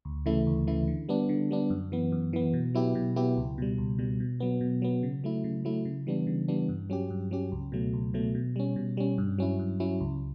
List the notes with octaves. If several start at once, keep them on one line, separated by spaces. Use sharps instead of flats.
D2
C#3 E3 A3 E4
D2
C#3 E3 A3 E4
D3
G3 B3 D4
D3
G3 B3 D4
F#2
E3 B3
F#2
E3 B3
B2
F#3 B3 E4 G4
B2
F#3 B3 E4 G4
C#2
B2 G3
C#2
B2 G3
B2
F#3 B3
B2
F#3 B3
C#3
F#3 A3 E4
C#3
F#3 A3 E4
C#3
E3 G3 B3 D4
C#3
E3 G3 B3 D4
G2
F#3 C#4 G4
G2
F#3 C#4 G4
C#2
B2 F#3 A3
C#2
B2 F#3 A3
B2
G3 C#4
B2
G3 C#4
G2
F#3 C#4 E4
G2
F#3 C#4 E4
C#2